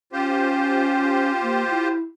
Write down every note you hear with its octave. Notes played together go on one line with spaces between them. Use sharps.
C#4 F4 G4 C5
A#3
E4